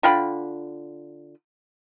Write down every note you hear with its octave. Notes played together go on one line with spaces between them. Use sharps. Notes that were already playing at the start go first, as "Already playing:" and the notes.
D3 F4 G5 B5